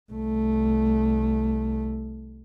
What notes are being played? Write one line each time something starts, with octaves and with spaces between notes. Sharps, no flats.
C2 A3